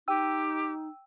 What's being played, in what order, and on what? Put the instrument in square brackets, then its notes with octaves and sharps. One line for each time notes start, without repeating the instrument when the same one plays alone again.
[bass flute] D#4 [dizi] G4 [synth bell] G5 E6